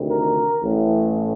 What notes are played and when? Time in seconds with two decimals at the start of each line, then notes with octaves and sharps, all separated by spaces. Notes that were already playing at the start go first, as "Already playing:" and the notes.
Already playing: D2 C3 D#3
0.09 A#4
0.62 A1 A2